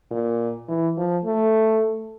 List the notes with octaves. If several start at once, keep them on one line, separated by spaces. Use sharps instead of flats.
A#2
E3
F3
A3